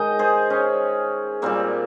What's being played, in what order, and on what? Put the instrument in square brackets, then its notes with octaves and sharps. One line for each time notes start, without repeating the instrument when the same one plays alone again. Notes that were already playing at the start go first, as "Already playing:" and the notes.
Already playing: [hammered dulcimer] D#3 G#3 D#5 G5
G#4 C5
C#4
A#2 G3 A#3 C4